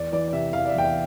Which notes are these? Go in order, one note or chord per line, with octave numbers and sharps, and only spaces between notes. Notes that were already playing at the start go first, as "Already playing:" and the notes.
Already playing: E2 D5
E3 D5
D5
C3 E5
E2 F5
D5
E5
E2 G5
F5